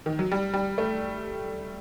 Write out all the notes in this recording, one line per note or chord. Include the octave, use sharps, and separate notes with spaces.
D#3
F#3
G3
G3
A3